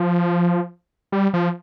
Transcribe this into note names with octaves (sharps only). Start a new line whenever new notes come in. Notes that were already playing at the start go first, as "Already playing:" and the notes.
Already playing: F3
G3
F3